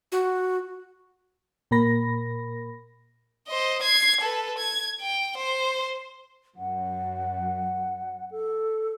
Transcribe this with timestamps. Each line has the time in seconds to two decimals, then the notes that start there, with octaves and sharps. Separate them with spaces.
0.12 F#4
1.71 A#2 A#3 A#4 B5 A#6
3.48 C5 D#5
3.82 G#6 C7
4.21 A4 B4
4.58 G#6
5.01 G5
5.38 C5
6.57 F#2 F#5
8.31 A4